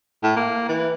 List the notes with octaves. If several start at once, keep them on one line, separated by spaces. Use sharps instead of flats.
A2
A#3
E3